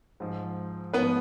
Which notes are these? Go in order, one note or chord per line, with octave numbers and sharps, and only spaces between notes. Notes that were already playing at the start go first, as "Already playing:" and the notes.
G#2 F3
G#2 F3 B3 B4